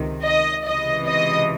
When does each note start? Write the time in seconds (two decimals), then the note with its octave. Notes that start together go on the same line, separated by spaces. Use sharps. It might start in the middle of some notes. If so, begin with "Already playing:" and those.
Already playing: C#2 C3 D#3
0.23 D#5
0.65 C#2 C3 E3 D#5
1.07 D#5